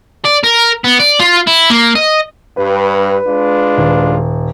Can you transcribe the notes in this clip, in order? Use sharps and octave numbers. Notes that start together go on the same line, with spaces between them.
D5
A#4
B3
D5
F4
E4
A#3
D#5
G2 B4
G#3 D4 F4
D#1